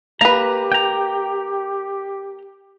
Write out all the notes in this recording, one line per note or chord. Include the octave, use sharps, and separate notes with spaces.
A#3 G4 B4 A#5
G5 A#5